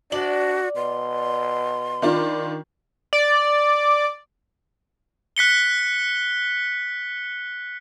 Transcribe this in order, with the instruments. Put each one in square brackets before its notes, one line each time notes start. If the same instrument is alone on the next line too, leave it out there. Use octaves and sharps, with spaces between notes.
[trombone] D4 [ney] F#4 [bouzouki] D5 [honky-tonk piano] F#7
[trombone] B2 [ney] C6
[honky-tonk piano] D#3 D4 F4
[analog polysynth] D5
[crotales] F#6 B6 C#7 G7